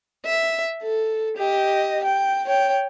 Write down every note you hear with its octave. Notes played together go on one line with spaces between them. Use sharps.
E5
A4
G4 D#5
G5
C#5 G5